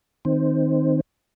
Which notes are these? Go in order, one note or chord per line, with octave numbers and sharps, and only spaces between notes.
D#3 C4